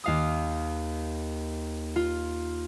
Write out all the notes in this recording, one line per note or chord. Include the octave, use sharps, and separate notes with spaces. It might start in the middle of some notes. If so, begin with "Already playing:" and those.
D#2 F5 D#6
F4